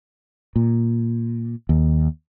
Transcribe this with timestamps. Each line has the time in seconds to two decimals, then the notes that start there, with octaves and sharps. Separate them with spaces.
0.56 A#2
1.69 D#2